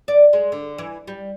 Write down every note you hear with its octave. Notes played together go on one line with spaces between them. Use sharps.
D5
G#3
D3
E3
G3